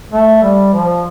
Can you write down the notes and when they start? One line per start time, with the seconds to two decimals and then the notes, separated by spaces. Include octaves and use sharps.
0.12 A3
0.42 G3
0.73 F3